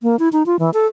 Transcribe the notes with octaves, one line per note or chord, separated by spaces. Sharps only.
A#3
E4
D#4
F4
E3
A4